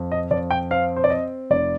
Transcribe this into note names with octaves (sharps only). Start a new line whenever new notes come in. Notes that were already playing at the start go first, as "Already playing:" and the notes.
Already playing: F2
D#5
F2 D5
G5
C4 F5
C5
D5
C4 D#5
F1 D5